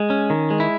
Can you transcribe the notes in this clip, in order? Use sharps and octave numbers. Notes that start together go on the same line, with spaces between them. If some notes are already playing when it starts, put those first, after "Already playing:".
Already playing: G#3
C#4
D#3
G#3
E4